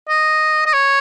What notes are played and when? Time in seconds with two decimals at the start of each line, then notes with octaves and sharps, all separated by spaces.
0.09 D#5
0.66 D#5
0.73 C#5